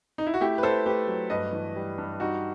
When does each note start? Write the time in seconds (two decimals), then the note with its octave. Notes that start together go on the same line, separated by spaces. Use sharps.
0.18 D#4
0.27 E4
0.34 F#4
0.41 A3 E4 G4
0.58 B4
0.63 A3 A4 C5
0.86 A3 G4 B4
1.08 F#3
1.30 G2 B4 D#5
1.53 E3
1.76 G3
1.98 G2
2.20 G3 D#4 F#4